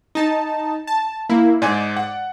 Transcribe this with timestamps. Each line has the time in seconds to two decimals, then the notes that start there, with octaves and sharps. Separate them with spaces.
0.15 D#4 A5
0.87 A5
1.29 A#3 E4
1.62 G#2 G#3 D5 G#5
1.97 F#5